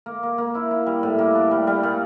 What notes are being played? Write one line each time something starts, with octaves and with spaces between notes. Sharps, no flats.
A#3
A#3
A#3
E4
E4
G3
A2
A#3
D4
G3
G3
A#2